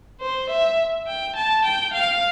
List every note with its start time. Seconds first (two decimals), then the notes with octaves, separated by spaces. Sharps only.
0.21 C5
0.50 E5
1.07 G5
1.36 A5
1.65 G5
1.93 F5